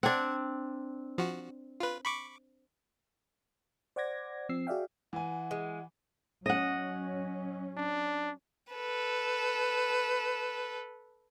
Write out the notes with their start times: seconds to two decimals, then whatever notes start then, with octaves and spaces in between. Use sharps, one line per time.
0.03 C4 D4 F#5 G#6
1.18 F3 F#4
1.80 F4 B4
2.05 B5 C#6 D6
3.96 C5 D5 F#5 D6 G#6 A#6
4.49 F3 C4 E6 C7
4.67 F#4 G#4 D5 E5 F5 G5
5.13 E3 F#5 G#5
5.51 G#3
6.46 F#3 C#4 D#5 F#5
7.77 D4
8.72 A4 B4